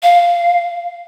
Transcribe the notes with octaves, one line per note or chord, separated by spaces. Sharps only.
F5